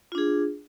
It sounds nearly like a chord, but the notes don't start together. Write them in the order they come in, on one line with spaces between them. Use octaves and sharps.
F4 D4 G#4